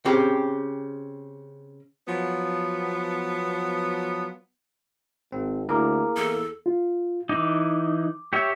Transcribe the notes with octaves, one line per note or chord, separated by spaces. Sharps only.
C#3 C4 G4
F3 F#3 B3
G#1 C4
D2 A#3 E4 G#4 A#4 A#5 D6
E2 A4
F4
E3 D#4 D6
G4 C#5 E5